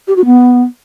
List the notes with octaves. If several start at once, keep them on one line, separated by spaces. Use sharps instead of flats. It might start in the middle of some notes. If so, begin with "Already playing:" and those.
G4
F#4
B3